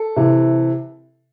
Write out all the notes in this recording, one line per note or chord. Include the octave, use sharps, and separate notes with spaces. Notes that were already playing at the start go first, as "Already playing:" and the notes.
Already playing: A4
C3 E3